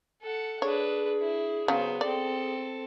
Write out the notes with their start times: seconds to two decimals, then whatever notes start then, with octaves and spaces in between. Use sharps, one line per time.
0.22 A4 F#5
0.62 D4 G#4 B4 C#5
1.21 E4
1.68 C#3 F#3 B3 C5
2.01 C4 A4 D5